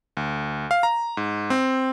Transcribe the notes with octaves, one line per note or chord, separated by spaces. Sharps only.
D2
F5
A#5
G#2
C4